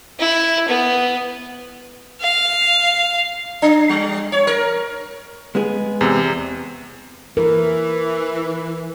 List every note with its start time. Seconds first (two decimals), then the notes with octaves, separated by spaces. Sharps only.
0.19 E4
0.68 B3
2.21 F5
3.62 D4
3.89 G3
4.32 C#5
4.47 A#4
5.55 G#3 B3 G#4
6.01 E2 C3
7.37 E3 A#4